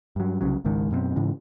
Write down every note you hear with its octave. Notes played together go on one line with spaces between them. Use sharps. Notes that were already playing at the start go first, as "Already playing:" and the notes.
G2 F#3
C2 C#3 F#3
G#1 C#2 G#2 D#3
F#2 B2 A#3 C4
G#2 C#3 E3